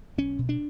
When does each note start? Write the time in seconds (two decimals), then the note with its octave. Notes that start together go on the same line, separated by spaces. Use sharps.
0.18 B1 C#4
0.39 B2
0.49 D4